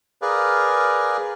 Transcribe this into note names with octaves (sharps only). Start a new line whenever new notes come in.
G#4 A#4 B4 D5 F5